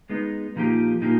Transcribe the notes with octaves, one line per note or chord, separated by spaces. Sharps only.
G#3 B3 D#4
A#2 F3 A#3 D#4 G4
A#2 F3 A#3 D#4 G4